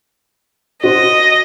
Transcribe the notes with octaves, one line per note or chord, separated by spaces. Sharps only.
F#4 C5 D#5